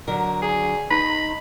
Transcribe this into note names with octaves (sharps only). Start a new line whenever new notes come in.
D3 F#3 A#4
G#4
D#4 B5